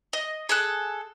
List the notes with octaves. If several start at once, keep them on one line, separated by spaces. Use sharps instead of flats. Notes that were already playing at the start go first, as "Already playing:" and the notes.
D#5
G#4 A4 F#6